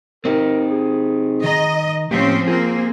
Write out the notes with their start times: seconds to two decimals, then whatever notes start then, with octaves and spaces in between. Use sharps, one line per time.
0.25 C4 D#4 G4 A#4
0.70 G#4
1.44 D#3 D#5 A#5
2.11 A2 F3 A#3 C4 C#4 G4
2.48 A#3 C4 F4 G#4